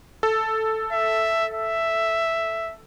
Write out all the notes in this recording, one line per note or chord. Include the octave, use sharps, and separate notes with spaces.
A4
E5
E5